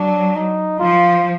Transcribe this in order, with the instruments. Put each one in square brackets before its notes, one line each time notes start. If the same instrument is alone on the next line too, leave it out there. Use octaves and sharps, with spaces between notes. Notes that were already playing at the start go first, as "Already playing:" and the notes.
Already playing: [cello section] F#3 [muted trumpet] D4
[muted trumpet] D#4
[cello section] F3 [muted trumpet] F4